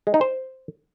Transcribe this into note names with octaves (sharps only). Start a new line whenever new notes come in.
G#3
D#4
C5